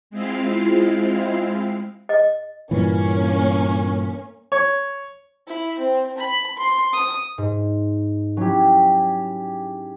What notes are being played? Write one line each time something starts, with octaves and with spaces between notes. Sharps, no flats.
G#3 C4 E4 F4 F5
D#5
G2 A#2 E3 A#3 C#4
C#5
E4
C4
B5
C6
D#6
G#2
F#3 C#4 E4 G4